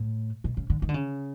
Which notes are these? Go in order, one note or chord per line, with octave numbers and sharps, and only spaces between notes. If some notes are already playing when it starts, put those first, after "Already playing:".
Already playing: A2
B2
C#3
D3
D#3
D3
C#3